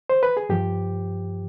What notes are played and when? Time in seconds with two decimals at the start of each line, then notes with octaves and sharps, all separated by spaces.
0.10 C5
0.23 B4
0.37 G#4
0.49 G2 F3 G4